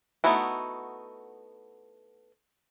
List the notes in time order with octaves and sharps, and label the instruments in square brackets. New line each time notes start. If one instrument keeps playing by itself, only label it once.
[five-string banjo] A3 B3 D#4 E4 F#4